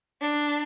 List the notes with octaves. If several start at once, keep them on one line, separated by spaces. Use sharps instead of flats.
D4